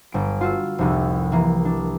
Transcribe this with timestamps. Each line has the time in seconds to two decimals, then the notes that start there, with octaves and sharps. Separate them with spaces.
0.12 G1 D7
0.41 F4 F#4 E6
0.78 F1 C2
1.32 E3 A#3
1.65 D4